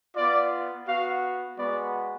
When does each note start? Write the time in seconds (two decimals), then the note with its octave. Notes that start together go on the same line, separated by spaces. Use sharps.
0.15 B3 F4 D5
0.86 B3 F#4 F5
1.57 G#3 B3 F#4 D5